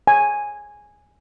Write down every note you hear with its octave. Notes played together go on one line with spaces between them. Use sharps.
G#5